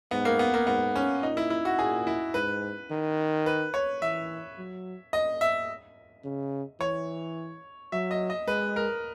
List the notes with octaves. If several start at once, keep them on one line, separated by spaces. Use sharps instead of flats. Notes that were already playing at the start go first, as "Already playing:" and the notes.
G#2 B3
A#3
B3
A#3
G#2 B3
C#4
A#2 D#4
E4
E4
F#4
A#2 G#4
E4
G#2 B4
D#3
B4
C#5
E3 E5
F#3
D#5
E5
C#3
E3 C#5
F#3 E5
D#5
D#5
G#3 B4
A#4